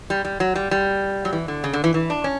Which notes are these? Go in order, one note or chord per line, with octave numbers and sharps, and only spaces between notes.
G3
G3
F#3
G3
G3
F#3
E3
D3
C#3
D3
E3
E3
D4
C#4